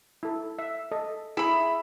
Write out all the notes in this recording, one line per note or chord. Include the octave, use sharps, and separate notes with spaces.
E4 A4
E5
A4 D#5
E4 G#4 E5 B5